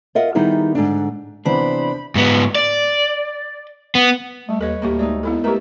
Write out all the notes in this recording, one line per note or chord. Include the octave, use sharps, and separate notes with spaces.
F4 A#4 D#5 E5 F#5
D#3 G3 B3 D#4 E4 G#4
G#2 D3 D4
C3 E3 B3 D4 C5 B5
G#2 B3
D5
B3
G3 A3
D#2 A4 B4 C#5 D#5
D2 A2 A#3 G4 A4
G#3 A3 D#4 D5
B3 E4 A4
G#3 A3 G4 A#4 B4 E5